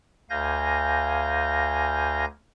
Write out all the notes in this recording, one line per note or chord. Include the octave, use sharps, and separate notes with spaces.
D2 F5 G#5 G6 A#6